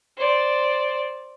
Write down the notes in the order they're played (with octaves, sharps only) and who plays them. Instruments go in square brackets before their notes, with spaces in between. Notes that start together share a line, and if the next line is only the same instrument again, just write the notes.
[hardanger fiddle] C5 D5